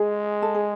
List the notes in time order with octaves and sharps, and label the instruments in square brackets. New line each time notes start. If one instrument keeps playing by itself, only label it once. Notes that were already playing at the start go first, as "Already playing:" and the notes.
Already playing: [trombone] G#3 [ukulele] G#4
[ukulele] A4
G#4